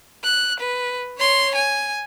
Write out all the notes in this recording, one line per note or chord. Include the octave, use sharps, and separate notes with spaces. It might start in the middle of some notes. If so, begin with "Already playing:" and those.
F#6
B4
C#5 C6
G#5